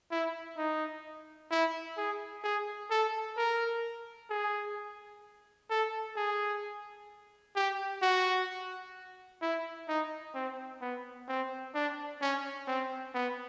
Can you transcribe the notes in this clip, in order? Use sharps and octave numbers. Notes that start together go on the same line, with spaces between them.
E4
D#4
E4
G#4
G#4
A4
A#4
G#4
A4
G#4
G4
F#4
E4
D#4
C4
B3
C4
D4
C#4
C4
B3